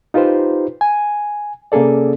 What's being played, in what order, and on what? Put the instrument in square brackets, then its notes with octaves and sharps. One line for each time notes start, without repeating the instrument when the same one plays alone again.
[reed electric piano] D#4 F4 G4 B4 C5
G#5
C3 A#3 C#4 G#4 A4 D5